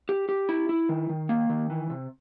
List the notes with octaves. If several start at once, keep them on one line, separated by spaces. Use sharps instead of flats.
G4
G4
E4
E4
D#3
D#3
A#3
D#3
E3
C3